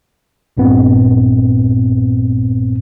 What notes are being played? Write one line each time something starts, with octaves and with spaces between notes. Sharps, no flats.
A#1 G2 A#2 B3 C4